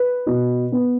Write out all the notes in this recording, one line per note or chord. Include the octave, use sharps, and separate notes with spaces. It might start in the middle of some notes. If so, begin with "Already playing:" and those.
Already playing: B4
B2
B3